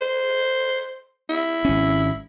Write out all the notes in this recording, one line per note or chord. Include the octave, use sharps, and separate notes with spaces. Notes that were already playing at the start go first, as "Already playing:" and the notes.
C5
E4
G#1 C#4